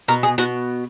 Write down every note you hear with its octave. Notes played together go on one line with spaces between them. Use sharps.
B2 A#4
G#4
B2 F#4